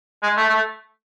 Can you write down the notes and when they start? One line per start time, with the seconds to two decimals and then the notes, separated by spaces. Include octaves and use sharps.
0.23 G#3
0.37 A3
0.50 A3